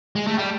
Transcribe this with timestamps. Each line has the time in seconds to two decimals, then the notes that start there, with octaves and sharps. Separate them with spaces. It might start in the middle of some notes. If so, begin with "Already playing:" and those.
0.16 G#3
0.27 A3
0.38 G3